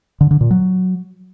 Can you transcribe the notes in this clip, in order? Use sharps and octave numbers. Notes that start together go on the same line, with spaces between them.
D3
D3
A#2
F#3